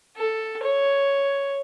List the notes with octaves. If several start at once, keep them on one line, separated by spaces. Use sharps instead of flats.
A4
C#5